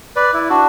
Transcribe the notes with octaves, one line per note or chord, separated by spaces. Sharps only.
B4 D5
E4
D4 F#4